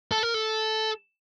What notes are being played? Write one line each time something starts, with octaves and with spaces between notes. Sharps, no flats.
A4
A#4
A4